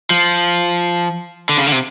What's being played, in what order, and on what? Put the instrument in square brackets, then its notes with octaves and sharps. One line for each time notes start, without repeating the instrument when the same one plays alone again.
[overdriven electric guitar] F3
D3
C#3
D3
C3